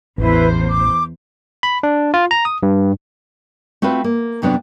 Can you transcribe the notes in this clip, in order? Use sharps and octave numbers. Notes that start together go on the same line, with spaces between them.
A1 E2 E4 B4 C5
D6
B5
D4
F4
A#5
D#6
G2
A3 C4 F4 F#4 B4
A#3
F2 C3 F#3 B3 D4